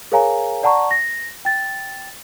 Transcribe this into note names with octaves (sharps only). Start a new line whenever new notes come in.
G#4 A#4 C#5 F5 G#5 A#5
D5 F#5 A5 A#5 C#6
A#6
G5 A6